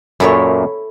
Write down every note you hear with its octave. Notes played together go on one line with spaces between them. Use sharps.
F#2 A#2 E4 A4 C#5